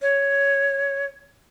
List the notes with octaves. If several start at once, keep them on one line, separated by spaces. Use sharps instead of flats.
C#5